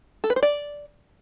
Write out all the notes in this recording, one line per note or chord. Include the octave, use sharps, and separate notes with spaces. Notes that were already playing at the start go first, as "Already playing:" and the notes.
A4
B4
C5
D5